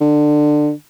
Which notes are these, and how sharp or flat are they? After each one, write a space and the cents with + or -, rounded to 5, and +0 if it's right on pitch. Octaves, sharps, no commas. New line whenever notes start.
D3 +20